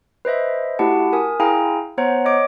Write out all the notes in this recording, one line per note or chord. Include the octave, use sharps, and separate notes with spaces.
B4 C5 D#5 E5
A3 E4 F#4 G4 F#5 A5
A#4 G#5 D#6
E4 G#4 F5 G5 G#5 A#5
B3 C5 C#5 F#5 A#5
C#5 D#5 D6 D7